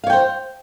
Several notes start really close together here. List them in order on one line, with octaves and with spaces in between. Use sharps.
F5 C#5 G5 C5